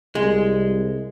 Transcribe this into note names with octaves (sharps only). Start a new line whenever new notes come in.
C2 G#3